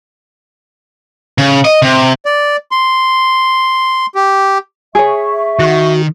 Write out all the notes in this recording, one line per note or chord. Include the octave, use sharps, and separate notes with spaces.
C#3
D#5
C3
D5
C6
G4
G#4 C#5 E5 C#6
D#3 F#4